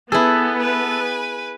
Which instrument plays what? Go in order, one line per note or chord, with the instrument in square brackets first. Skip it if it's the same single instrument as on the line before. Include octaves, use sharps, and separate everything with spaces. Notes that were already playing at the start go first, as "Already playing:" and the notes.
[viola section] B3 [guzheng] E4 G#4 [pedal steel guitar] A4
[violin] B4 G#5